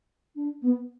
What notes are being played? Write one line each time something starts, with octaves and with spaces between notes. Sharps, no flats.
D4
B3